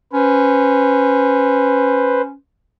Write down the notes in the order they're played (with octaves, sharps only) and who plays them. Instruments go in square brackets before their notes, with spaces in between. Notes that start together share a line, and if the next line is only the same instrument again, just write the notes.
[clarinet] C#4 [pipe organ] B4 C5